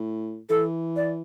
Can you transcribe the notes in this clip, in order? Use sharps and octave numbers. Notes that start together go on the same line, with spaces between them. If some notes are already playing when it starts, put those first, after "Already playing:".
Already playing: A2
E3 A4
D5